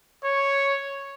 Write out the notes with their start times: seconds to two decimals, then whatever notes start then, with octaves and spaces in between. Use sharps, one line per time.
0.24 C#5